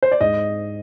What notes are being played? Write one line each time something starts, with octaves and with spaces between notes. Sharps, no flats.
C5
D5
G#2 D#5